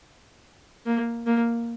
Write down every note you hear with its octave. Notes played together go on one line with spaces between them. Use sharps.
A#3
A#3